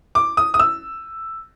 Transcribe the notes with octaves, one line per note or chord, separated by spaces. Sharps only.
D6
D#6
D#6
E6